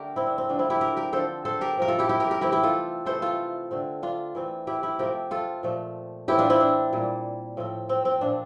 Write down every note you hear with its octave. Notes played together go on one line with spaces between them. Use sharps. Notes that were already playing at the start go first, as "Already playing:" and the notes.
Already playing: D3 A3 G4 A#4
C4 E4
D4
C4
D3 F3 A3 D4
C4 E4
E4 G4
G4 A#4
G4 A#4
D3 F3 C4 A4 C5
A4 C5
G4 A#4
C3 F3 A3 A#4
F4 A4
E4 G4
E4 G4
G4 A#4
G4 A#4
E3 A3 C4 E4 G4
E4 G4
F4 A4
C3 E3 A3 A4 C5
F4 A4
D3 A3 C4
D4 F4
E3 A3 C4
E4 G4
E4 G4
C3 F3 A3 C4 G4 A#4
F4 A4
A#2 F3 A3
A2 E3 A3 C4 E4 G4
D4 F4
C4 E4
D4
A#2 G3 A#3
A2 F3 C4
C4
C4
A#2 F3 C4 D4